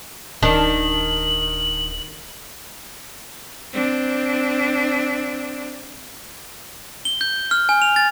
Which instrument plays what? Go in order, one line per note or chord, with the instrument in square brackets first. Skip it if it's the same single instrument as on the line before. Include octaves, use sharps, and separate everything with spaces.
[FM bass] D1 [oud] D#3 D4 [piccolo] F#7
[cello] C4 D4
[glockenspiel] G7
G6
F6
G#5
F7
A6